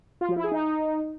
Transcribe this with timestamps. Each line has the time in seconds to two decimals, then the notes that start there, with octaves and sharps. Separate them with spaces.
0.21 F4
0.29 F3
0.36 E4
0.44 G#4
0.52 D#4